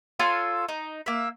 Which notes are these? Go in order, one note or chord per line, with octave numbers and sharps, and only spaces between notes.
F4 A4 C#5 C6
D#4
A#3 E5